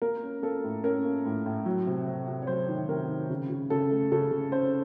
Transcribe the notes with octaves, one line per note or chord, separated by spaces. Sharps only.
A#3 A#4
C#4
A#3 A4
A2
C#4 A#4
A#3
A2
A2
F#3
C3
C3
C3
C#5
F#3 C5
D#3
C3 A#4
D#3
C#3
C#3
C#3 A4
A3
C#3 A4
C#3
C#4 C5